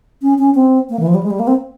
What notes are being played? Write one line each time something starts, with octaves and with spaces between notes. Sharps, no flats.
C#4
C#4
C4
A#3
E3
F3
G3
G#3
G3
A#3
C4